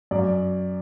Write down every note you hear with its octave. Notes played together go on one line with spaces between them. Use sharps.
F#2 D5